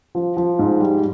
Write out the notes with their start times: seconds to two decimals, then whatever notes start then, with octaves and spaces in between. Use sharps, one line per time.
0.15 F3
0.37 F3
0.59 G#2
0.80 G3